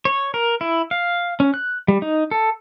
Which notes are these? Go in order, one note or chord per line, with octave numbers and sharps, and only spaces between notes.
C#5
A#4
E4
F5
C#4
F#6
G3
D#4
A4